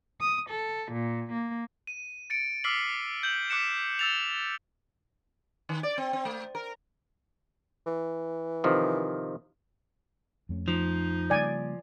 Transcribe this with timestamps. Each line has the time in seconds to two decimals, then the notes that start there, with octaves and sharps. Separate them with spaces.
0.21 D#6
0.50 A4
0.92 A#2
1.32 A#3
1.87 D#7
2.30 A6 C#7 D7
2.64 D6 E6 F6 B6 C7 F#7
3.23 G6 F#7
3.50 D6 F#6 B6 C#7 E7
3.99 E6 A6 F7
5.69 D#3
5.83 D5
5.98 C4
6.13 C4
6.25 A3
6.55 A#4
7.86 E3
8.64 C3 D#3 F3
10.49 F2 A3 C#4
10.68 F3 D#4
11.30 C#3 G3 A#3 D5 G#5